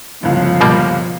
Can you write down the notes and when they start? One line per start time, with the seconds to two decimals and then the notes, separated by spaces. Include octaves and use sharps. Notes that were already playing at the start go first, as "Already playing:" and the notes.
0.23 G1 C#2 F3
0.61 B2 G3 A#3